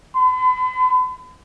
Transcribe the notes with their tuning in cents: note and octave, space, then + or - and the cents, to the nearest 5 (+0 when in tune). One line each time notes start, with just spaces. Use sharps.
B5 +45